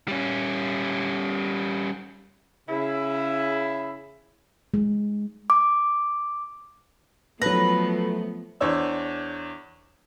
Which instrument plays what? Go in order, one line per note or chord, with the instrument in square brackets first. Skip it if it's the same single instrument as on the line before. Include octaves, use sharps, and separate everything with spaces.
[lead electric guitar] G3 C#4
[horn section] C#3 E4
[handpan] G#3
[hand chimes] D6
[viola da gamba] F3 B3 [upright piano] F#3 A#6 [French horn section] A3 [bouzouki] B4
[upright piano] E2 D4 C5 C#5 E6